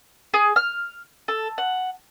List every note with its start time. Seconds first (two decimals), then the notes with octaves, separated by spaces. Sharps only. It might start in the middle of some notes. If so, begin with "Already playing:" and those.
0.34 G#4
0.56 F6
1.28 A4
1.58 F#5